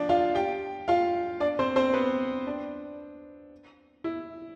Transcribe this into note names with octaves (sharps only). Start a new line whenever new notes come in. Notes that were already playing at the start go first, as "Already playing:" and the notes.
Already playing: F3 D4 D5
F4 F5
G4 G5
F4 F5
D4 D5
C4 C5
C4 C5
B3 B4
D4
E4